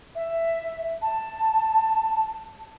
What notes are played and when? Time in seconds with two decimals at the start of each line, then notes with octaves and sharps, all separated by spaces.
0.15 E5
1.02 A5